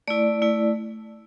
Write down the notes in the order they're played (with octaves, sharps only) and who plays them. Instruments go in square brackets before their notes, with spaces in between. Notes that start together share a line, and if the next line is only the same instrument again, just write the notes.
[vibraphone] A3 E4 D5
A3 E4